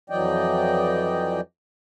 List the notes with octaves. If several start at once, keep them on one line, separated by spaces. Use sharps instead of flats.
F2 E3 F#3 D5 D#5 G5